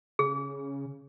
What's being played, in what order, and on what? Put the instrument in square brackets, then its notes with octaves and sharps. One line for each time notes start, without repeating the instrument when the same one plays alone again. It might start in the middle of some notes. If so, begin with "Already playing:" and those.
[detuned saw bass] C#3 [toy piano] G#4